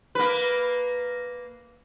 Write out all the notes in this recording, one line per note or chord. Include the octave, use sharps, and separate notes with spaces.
A#3 B4